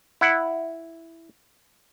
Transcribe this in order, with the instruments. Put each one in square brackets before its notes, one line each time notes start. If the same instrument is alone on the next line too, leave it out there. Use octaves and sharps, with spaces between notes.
[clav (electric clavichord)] E4 F#5